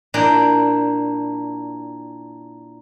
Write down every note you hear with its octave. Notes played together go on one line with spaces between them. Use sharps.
A#2 D4 E4 G5 G#5 A#5